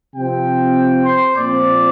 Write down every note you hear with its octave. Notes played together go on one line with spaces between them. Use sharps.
C3 F3 C4 G5
C5
A#2 F3 C4 D5